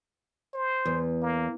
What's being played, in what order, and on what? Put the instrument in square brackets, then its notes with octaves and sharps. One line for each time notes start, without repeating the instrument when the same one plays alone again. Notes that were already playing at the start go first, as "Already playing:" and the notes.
[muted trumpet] C5
[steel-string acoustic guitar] E2
[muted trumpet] A#3